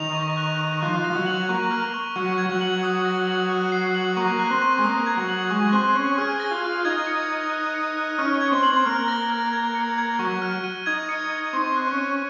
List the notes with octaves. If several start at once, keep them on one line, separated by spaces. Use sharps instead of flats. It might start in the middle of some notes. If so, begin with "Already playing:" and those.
Already playing: D#3 F7
C#6
F#6
C#6
F3 F#6
A#6
F3
F#3
F#7
A#3 C#6
F6
C#6
F#3 C#6
G#6
F#3
F#7
D#6
A#6
F#7
F#6
C7
F#7
A#3 C#6
F#6
C4
C#6
G#3
A#3 D#6
G#6
F#3
F#7
G#3 C#6
C4 F#6
C#4 C#6
G#4 F6
A#6
F4
F6
D#4 G#6
C#7
G#6
F#6
C#7
F#6
C#4 F6
G#6
C4
F#7
C4
A#3 F6
A#6
F6
G#6
C#7
G#6
F#3 C#6
F6
D#7
D#4 G#6
C#7
G#6
C4 C#6
F#6
C#4
D#7